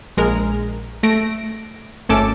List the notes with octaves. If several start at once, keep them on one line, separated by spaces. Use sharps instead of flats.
A#1 G#3 A#4
A3 A#6 D7
G#1 A3 C#4 A4 A5 D6